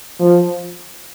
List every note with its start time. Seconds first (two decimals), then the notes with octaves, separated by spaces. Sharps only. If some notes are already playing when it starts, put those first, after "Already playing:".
0.20 F3